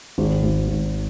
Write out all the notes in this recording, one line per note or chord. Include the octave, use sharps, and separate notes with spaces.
G#1
G#1
G#1